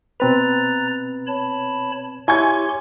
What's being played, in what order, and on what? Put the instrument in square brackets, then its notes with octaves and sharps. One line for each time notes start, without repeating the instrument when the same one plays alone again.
[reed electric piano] B2 C4 B4 [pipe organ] A#5 F#6 A6
[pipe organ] C#5 A5 B5
[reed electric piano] E4 [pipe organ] G4 C#5 C6 [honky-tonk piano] G#5 C#6 G#6